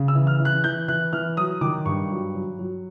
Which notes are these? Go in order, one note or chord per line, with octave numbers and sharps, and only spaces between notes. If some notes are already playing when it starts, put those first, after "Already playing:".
Already playing: C#3
E6
E3
F6
E3
F#6
E3 G6
E3 F#6
E3 F6
F#3 D#6
D#3 D6
G2 C#6
F#3
F#3
F#3